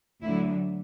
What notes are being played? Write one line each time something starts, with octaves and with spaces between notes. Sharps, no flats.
D2 D3 F#3 E4